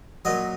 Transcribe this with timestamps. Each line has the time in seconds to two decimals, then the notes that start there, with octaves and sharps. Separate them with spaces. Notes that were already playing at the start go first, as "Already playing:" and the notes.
0.25 A#2 F#3 D#5